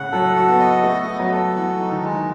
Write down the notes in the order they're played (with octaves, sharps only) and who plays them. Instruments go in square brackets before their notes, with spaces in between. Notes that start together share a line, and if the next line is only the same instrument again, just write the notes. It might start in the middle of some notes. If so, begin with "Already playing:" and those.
Already playing: [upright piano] A2 C#3 [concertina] F#5
[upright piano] F#3 [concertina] A4
[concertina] F#4
[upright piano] B3
[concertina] D#5
[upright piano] A3 [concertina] B3
[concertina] B3
[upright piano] F#3
[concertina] A4
[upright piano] E3 [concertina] F#4
[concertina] D#4
[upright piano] D#3
[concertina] G#3